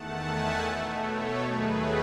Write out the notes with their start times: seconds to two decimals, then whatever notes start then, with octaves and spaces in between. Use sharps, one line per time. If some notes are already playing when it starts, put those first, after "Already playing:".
Already playing: E2 D#3 A3 F#5 A5
0.19 E5 G#5
0.60 B2 A3
1.00 A4 C#5
1.40 D#2 D#3 F#3 A3 G#4 B4